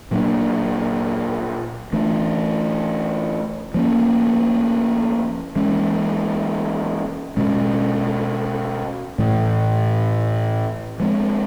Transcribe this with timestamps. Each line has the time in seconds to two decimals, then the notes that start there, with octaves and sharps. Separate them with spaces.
0.11 A#2 F#3 A#3 D4
1.93 E3 A3 D4
3.74 F3 A#3 C#4
5.56 E3 G#3 C#4
7.37 B2 G#3 C#4
9.18 A2 E3 A3
11.00 F3 G#3 C4